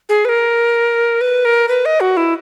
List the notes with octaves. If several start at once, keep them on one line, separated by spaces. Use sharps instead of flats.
G#4
B4
A#4
B4
A#4
B4
D#5
F#4
E4